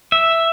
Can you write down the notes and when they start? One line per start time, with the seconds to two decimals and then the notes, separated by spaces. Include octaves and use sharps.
0.12 E5